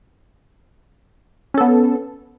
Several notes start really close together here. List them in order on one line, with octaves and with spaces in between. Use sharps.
C#4 A4 B3